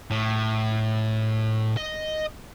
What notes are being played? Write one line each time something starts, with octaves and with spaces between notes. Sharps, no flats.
A2
D#5